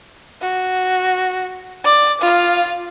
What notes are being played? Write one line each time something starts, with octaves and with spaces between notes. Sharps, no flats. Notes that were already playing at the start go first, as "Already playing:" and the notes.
F#4
D5
F4 F5